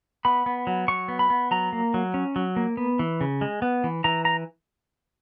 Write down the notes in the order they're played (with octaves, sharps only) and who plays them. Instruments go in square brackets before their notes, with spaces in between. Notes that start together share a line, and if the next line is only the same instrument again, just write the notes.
[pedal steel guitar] B3 B5
B3
F#3
F#3 C#6
B3
B5
B3
F#3 A#5
A#3
F#3
C#4
F#3
A#3
B3
E3
C#3
G#3
B3
E3
E3 A#5
A#5